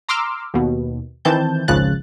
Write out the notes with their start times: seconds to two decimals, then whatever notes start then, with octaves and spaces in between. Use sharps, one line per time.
0.09 A#5 C6 D6 E6 F6
0.54 D#2 B2
1.25 D#3 E3 C4 A5 G6
1.68 G#1 C#2 C#3 F3 F#6 A6